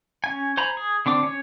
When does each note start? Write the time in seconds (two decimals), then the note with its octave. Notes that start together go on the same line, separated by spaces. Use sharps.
0.24 C#4 G#5
0.57 C5 G#5 A#5 B5
0.77 G#4
1.06 D3 C4 D4 D6
1.23 C#4 C#5